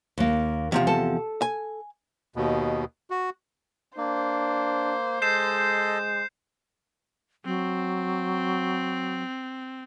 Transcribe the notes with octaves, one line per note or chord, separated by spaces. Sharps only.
D#2 A#3
E2 C3 F3
A4 A5
G#5
D#2 B2
F#4
A#3 D4 C5
G#3 A4 D#5 G6 C7 E7
F#3 C4